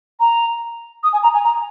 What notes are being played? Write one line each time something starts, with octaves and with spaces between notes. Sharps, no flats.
A#5
D#6
G#5
A#5
G#5
A#5